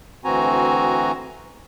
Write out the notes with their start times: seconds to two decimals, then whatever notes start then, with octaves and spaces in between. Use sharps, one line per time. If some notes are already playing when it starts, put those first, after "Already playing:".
0.25 D2 E3 C4 F#4 G#5 A#5